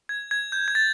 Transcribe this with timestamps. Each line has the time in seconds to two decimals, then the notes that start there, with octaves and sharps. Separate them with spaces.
0.09 G#6
0.31 G#6
0.52 G6
0.68 G#6
0.75 A6